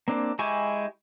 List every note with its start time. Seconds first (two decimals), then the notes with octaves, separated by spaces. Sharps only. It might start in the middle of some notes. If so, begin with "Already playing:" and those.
0.08 A#3 C4 D4
0.39 G#3 E4 G4 G#5 C#6